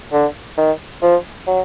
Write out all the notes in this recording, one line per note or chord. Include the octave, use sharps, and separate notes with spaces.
D3
D#3
F3
F#3